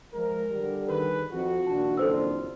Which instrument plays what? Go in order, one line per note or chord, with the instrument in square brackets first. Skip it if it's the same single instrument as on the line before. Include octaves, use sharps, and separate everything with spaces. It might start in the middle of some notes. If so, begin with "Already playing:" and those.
[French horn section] F3 G#3 [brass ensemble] A#4
[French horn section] D3 G3
[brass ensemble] D#3 G#4 B4 [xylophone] A#4
[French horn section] F2 [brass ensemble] F4 F#4
[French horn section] A#2 D#3 D4 [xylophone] A5
[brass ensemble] F#1 F2 F4 [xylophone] A4 C5 E6